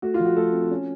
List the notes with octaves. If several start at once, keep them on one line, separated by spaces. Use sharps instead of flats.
A3 F#4
F4
F3
F#4
A3 A4
C4
C#4